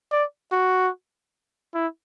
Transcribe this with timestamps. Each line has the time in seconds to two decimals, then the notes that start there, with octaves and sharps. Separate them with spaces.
0.11 D5
0.52 F#4
1.74 E4